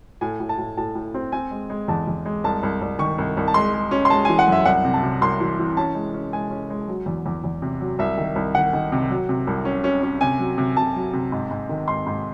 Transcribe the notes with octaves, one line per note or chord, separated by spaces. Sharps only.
A2 G#5
A2
A5
A2
A2 A5
A2
C4
C4 G#5
G#3
G#3
E2 A5
E2
G#3
C2 A5
C2
C2
D#3 C#6
C2
C2
A5
G#3 C6
G#3
C#4
C6
G#3 A5
E3 G#5
F#5
F#2 E5
C2 F#5
C3
A5
C3
C2 C6
E3
E3
C#4 A5
G#3
C#4
G#3 G#5
C#4
G#3
F#3
E2
E2
E2
C3
F#3
C2 E5
D#3
C2
D#3 F#5
D#3
C3
F#3
C3
C2
C#4
C#4
C#4
C3 G#5
F#3
C3
C3 A5
F#3
C3
G#2
G#2
D#3
G#2 C6
G#2